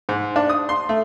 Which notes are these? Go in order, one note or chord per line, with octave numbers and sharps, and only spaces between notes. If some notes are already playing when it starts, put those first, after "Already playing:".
G#2
D4
D#6
C6
A3